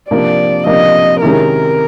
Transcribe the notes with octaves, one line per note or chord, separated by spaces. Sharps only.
C3 F3 A#3 D4 D5
C3 F3 A#3 D4 D#5
C3 D#3 G#3 C#4 E4 A#4